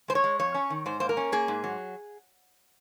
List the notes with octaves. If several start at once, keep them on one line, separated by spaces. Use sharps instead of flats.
G#3 C5
C#5
G#3
F2 C#5
C#4
D#3
G#2 C5
A#3 C5
A#4
C#4
A#3 G#4
G#2
F#3